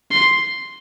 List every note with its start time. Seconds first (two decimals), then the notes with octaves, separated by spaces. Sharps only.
0.11 C6